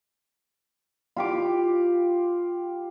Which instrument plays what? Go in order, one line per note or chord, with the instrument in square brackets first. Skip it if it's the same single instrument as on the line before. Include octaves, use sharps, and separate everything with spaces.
[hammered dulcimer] F4 G4 D6